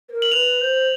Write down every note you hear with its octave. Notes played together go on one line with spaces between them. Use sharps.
B4
A#4
F#7
B4 F7
C5